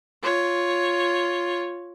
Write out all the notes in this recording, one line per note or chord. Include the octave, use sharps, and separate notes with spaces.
F4 C#5